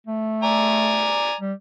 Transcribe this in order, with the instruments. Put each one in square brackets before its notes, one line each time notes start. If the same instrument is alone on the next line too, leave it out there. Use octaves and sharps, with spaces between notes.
[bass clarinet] A3
[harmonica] D5 G#5 A#5
[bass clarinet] G3